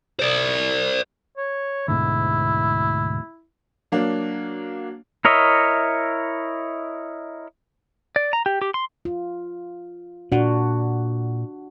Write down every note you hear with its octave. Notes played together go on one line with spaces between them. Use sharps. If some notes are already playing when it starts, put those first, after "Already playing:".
C5 D5
C#5
D2 G#2 B2 E4
F#3 A#3 D4
E4 A#4 C#5 D#5 E5
D5
A#5
G4
G4
C6
F4
A#2 D4 F#4 F#5